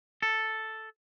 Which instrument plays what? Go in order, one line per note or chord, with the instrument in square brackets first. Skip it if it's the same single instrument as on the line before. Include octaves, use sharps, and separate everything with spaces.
[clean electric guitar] A4